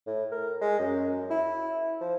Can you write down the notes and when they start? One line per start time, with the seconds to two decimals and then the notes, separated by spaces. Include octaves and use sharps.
0.07 A2
0.31 A#4
0.61 G#3
0.79 F#2
1.30 E4
2.01 F3